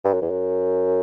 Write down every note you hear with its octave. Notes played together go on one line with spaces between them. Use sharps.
G2
F#2
E2
F#2